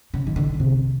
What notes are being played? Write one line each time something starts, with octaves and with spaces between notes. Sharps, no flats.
C#3
D#3
D3
C3